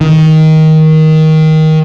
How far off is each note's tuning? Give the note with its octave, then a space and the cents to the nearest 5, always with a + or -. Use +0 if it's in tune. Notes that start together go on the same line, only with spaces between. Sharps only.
D#3 +15